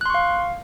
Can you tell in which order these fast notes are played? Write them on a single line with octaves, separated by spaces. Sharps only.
F#6 C6 C#6 F5